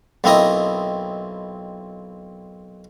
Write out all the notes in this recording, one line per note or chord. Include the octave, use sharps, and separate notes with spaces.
B1 A#3 C4 E4 D#5 D#6